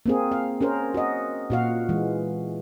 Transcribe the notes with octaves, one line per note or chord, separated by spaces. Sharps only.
A#3 C4 G#4
F5
C#4 G#4 A#4 C5
F#4 D#5
A#2 F#4 F5
E3 G#3